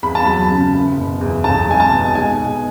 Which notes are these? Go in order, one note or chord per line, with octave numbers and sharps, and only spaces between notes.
E2 B5
A5
F#3 B5
C#3
F#1
B2
E2
B1 A5
G#3 G#5
A5
B2
G#3 G#5
B2